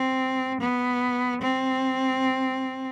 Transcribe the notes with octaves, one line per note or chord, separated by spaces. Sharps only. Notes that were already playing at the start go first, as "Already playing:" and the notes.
Already playing: C4
B3
C4